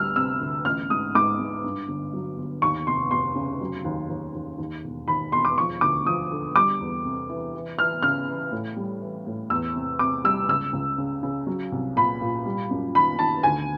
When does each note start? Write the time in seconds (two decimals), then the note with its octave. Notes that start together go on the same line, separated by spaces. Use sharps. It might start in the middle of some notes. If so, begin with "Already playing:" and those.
Already playing: D2 G3 E6 F6
0.16 C3 E6
0.41 D2
0.65 A1 F6
0.90 G#2 D#6
1.15 G#2 D6
1.39 G#2
1.64 G2
1.89 G1
2.13 F#3
2.38 G1
2.62 D#2 C#6
2.87 F1 C6
3.11 F1 C6
3.35 C#3
3.61 F#3
3.85 D#2
4.09 D#2
4.35 D#2
4.58 D#2
4.84 E1
5.08 D#2 B5
5.32 E1 C6
5.45 D6
5.58 F3 C#6
5.81 D2 D6
6.06 F3 D#6
6.32 D3
6.55 G3 D6
6.80 E2
7.05 C3
7.29 E3
7.54 E3
7.78 E3 F6
8.03 C#3 F6
8.28 E3
8.52 A2
8.76 G3
9.01 E3
9.27 A2
9.50 E2 E6
9.76 C3
9.99 C3 D6
10.24 G3 E6
10.48 C#2 E6
10.73 C#2
10.98 C#3
11.23 C#3
11.47 F#3
11.72 C2
11.96 A#2 B5
12.21 A#2
12.45 G3
12.71 F#2
12.95 D#3 B5
13.19 D#3 A5
13.43 D2 G#5